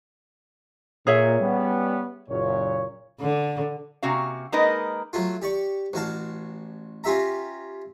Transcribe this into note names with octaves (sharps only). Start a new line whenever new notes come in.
A#2 G#4 C#5 E5
G3 B3 C#4
F#1 A#2 C#5
D3
C3 A#3 C#4 F#4 F5
G#3 A#3 D#4 A#4 B4 D#5
F#3 A3 F4
G4 D5 C#6
A1 F#4 F5 A5
C#4 F4 G4 E5 A#5